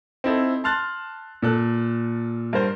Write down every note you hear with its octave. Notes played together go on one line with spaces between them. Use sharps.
C4 D#4 E4 A4
A5 C6 F6 F#6 A6
A#2 A4 F#6
G2 A#4 C5